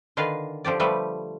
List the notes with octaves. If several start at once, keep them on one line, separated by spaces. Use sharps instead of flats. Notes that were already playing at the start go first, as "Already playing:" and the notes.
D3 D#3 F4 B4 F5
D3 F3 G4 D5
F3 G3 A3 B4